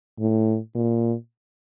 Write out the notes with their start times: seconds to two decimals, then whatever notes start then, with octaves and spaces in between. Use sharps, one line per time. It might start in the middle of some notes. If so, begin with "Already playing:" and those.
0.19 A2
0.75 A#2